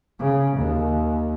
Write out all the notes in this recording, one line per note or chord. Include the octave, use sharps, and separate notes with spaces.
C#3
D#2